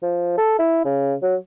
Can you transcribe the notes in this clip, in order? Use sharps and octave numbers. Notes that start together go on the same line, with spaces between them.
F3
A4
E4
C#3
F#3